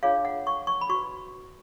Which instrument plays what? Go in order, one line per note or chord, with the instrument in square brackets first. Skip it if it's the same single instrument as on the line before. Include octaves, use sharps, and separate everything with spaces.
[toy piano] D4 F4 G#4 C#5 F5
F#5
C#6
C#6
B5
F#4 B4 C#6